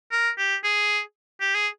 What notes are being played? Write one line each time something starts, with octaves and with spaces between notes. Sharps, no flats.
A#4
G4
G#4
G4
G#4